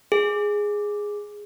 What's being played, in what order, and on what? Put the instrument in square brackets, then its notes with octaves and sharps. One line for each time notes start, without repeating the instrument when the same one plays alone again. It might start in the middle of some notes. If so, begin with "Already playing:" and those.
[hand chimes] G#4